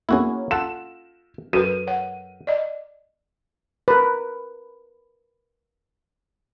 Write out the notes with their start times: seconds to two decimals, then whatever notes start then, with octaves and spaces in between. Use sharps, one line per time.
0.09 A#3 C#4 E4 F#4 G#4
0.51 F4 A4 F#5 E7
1.53 F#2 F#4 A4 B4 D#7 E7
1.87 C#5 F#5
2.47 D5 D#5
3.88 A#4 B4